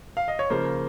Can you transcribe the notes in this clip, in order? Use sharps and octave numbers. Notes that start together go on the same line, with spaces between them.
F5
D#5
C#5
C#3 F3 A#3 C5